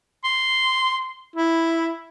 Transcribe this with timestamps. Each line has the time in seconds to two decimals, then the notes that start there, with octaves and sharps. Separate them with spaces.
0.24 C6
1.36 E4